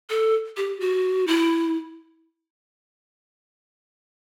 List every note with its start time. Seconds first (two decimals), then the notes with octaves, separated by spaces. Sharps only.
0.10 A4
0.57 G4
0.80 F#4
1.27 E4